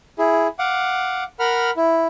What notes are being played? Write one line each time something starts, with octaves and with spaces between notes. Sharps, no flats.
E4 G#4
F5 F#5 D6
A#4 F#5 B5 F6
E4